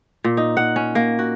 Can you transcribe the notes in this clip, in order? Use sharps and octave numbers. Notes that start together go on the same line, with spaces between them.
A#2
D#4
F#5
C#4
A#3
F#4